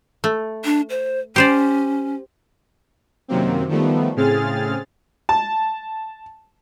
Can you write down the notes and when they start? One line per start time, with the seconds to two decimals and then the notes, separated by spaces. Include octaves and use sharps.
0.24 A3
0.65 D4
0.90 C5
1.36 C#4 G4 C5 D5
3.28 F#2 C3 D#3 F#3 A#3 C4
3.68 D#3 F3 G3 A3 B3
4.16 A2 C#3 C4 G#4 F6 A6
5.29 A5